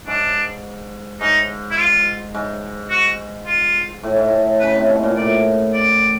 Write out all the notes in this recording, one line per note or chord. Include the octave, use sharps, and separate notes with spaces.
G#2 D4
G#2 D#4
E4
F4
G#2
F#4
F4
A2
G#2
A2
C#3 B4
C3
B2
A#2
A2 D5
D5